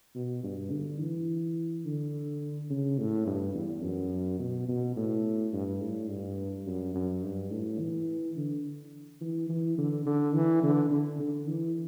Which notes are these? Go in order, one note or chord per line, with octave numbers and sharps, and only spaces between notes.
B2
G2
D3
E3
D3
C#3
A2
G2
E2
F#2
B2
B2
A2
G2
A2
G2
F#2
F#2
G2
A2
E3
D3
E3
E3
D3
D3
E3
D3
D3
D3
E3